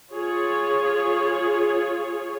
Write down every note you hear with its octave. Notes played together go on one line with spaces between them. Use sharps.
F4 G#4 C#5